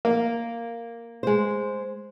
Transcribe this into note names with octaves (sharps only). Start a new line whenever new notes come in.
A#3
G#3 C5